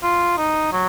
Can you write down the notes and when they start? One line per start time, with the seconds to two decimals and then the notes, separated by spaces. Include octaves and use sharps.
0.03 F4
0.38 D#4
0.72 F#3